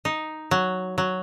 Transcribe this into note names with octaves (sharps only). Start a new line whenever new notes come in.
D#4
F#3
F#3